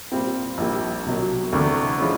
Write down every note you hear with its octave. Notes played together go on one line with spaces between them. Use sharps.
A#2 G3 C4 F4
A#1 A#2 G3
C2 B2 F#3
D2 C3 E3 A3 D4
F3 G#3 C#4 E4